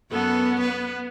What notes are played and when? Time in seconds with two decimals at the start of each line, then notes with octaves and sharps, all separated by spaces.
0.12 F#2 B3 A4 C#5
0.62 B4